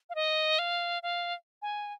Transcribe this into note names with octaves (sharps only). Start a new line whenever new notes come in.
F5
D#5
F5
F5
G#5